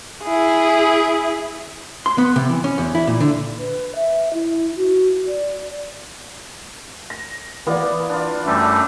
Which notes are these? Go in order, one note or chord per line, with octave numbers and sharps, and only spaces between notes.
E4 G#4
C6
B3
C3
E3
C#4
E2
E4
A#2
D3
B4
E5
E4
F#4
D5
A#6
E3 A#3 B3 D5
D4 F4
F#2 G3 A3